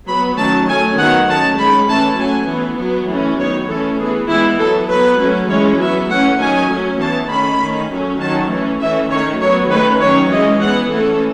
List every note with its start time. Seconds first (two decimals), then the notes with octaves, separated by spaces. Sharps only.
0.08 F#3 B3 B5
0.38 D#3 F#3 A3 C#4 A5
0.68 F#3 A3 C#4 G#5
0.98 D#3 F#3 B3 F#5
1.28 D#3 A3 C#4 A5
1.59 D#3 G#3 C#4 B5
1.89 E3 A3 C#4 A5
2.19 F#3 A3 C#4 G#5
2.49 E3 B3
2.80 F#3 B3
3.09 E3 A3 C#4
3.39 D#3 F#3 B3 C#5
3.70 E3 A3 C#4 A4
3.99 E3 B3 G#4
4.29 E3 G#3 B3 E4
4.60 F#3 B3 A4
4.89 F#3 B3 B4
5.20 F#3 A3 C#4
5.50 E3 G#3 C#4 C#5
5.80 F#3 B3 E5
6.10 E3 A3 C#4 F#5
6.41 D#3 F#3 C#4 G#5
6.71 F#3 A3 C#4
7.00 E3 B3 A5
7.30 D#3 A3 C#4 B5
7.61 D#3 A3 C#4
7.91 F#3 A3 C#4
8.20 D#3 F#3 C#4 A5
8.51 E3 A3 C#4
8.81 E3 A3 C#4 E5
9.11 D#3 A3 C#4 C#5
9.41 F#3 B3 C#5
9.71 D#3 A3 C#4 B4
10.01 D#3 F#3 C#4 C#5
10.32 E3 G#3 C#4 D#5
10.61 E3 B3 F#5
10.91 E3 A3 C#4 A4